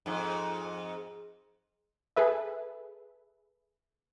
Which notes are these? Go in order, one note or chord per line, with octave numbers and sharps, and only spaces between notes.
F2 G#2
G#4 A4 B4 E5